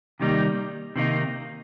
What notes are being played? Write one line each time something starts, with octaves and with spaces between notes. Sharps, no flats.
C3 D#3 G3 A#3 D#4
C3 D#3 A#3 D#4